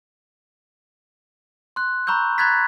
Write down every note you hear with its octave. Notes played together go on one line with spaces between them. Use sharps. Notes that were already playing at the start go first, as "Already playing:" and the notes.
C6 F#6
A#5 B5 C#6 E6 G6
A#5 B5 F#6 G#6 A6 B6